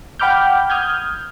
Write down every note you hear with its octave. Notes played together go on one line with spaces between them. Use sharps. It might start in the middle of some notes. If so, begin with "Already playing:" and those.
F#5 G5 B5 D6 F6 G6
D#6 F6 G6 G#6